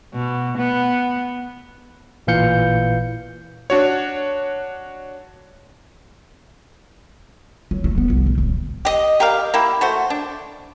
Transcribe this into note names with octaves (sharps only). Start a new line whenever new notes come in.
B2
B3
A1 A#2 E3 F5 G6 C#7
D4 F#4 C#5
F#3
A3
B3
C2
A#2
D1
G4 D#5
G4 A#4 D5 F5
A#3 E4 G4
A3 F#4 C5
D4